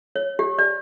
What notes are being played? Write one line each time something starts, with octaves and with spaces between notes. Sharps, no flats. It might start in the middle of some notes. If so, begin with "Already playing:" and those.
C#5
G4
D5